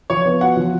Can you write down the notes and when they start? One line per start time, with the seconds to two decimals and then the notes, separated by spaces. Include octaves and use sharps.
0.10 F3 C#5
0.25 B3
0.41 F#4 F#5
0.57 F3